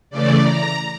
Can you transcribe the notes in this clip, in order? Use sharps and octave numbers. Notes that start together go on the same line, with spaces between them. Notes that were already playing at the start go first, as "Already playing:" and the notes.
C#3 E3 A3 D5
A#5